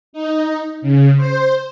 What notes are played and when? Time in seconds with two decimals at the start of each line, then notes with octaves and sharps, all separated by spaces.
0.13 D#4
0.82 C#3
1.17 C5